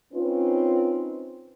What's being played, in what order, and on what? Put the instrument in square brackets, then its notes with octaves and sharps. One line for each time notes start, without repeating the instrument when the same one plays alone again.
[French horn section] C4 C#4 D#4 F4 B4